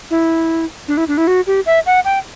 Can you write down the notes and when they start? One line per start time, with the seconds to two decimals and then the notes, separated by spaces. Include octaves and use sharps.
0.11 E4
0.88 D4
0.97 E4
1.08 D4
1.18 E4
1.27 F#4
1.47 G4
1.66 E5
1.86 F#5
2.05 G5